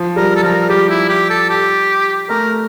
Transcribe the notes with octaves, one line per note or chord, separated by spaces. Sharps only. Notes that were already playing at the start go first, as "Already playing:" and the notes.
Already playing: F3
G3 A#4
A4
F3 A#4
G3 G4
E4
G4
A4
G4
A3 A#4